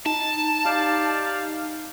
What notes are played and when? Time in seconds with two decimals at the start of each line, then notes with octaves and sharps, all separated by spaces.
0.06 D#4 A5
0.65 D#4 G4 D5 F5